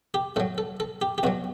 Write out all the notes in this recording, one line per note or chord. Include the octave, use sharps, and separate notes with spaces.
G4
A2 F#3 A4
A4
A4
G4
G4
E2 B2 F#3 F#4